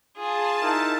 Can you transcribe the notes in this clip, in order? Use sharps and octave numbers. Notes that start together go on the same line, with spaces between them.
F4 G#4 A5
D#4 E4 A#4